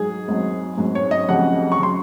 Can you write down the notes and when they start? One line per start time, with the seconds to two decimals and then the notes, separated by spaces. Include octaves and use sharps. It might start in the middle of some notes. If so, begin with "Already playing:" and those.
Already playing: G#2 F#3 G#4
0.28 G#1 G#2 F#3
0.77 G#1 G#2 F#3
0.95 C#5
1.11 D#5
1.28 F1 F2 C#3 F#3 F#5
1.72 C#6
1.79 C#3 F#3 C6